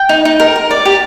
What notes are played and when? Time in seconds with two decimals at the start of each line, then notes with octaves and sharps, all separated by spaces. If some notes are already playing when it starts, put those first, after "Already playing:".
Already playing: G5
0.09 D#4
0.25 D#4
0.40 A#4
0.56 A#4
0.71 D5
0.85 G4